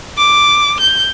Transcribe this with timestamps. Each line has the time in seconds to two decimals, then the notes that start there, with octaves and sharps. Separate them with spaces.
0.17 D6
0.81 G6